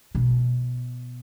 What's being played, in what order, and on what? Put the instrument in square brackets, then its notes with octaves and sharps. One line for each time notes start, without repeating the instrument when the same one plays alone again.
[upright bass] B2